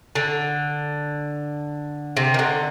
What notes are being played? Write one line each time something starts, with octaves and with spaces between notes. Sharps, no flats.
D3
C3
D#3
D3